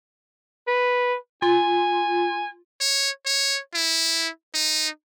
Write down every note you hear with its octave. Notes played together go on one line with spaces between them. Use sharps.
B4
F4 G#5
C#5
C#5
E4
D#4